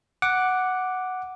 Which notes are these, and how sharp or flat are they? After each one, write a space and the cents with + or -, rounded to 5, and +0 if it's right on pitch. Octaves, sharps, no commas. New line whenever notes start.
F#5 +0 D6 +0